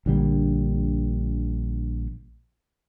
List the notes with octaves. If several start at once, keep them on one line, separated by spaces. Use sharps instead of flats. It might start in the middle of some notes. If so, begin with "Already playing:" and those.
A#1 D3 G3 A#3